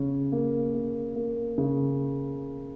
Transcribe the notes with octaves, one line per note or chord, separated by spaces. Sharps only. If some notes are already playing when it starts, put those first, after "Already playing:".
Already playing: C#3 C#4
A#3
A#3
A#3
C#3